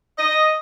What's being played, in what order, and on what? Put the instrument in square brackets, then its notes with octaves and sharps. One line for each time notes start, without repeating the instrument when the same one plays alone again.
[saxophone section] D#5